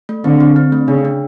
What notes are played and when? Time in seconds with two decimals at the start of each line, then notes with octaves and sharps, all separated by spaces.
0.09 A3
0.24 D3 C4
0.40 C4
0.56 C4
0.72 A3
0.88 C#3 D4
1.05 D4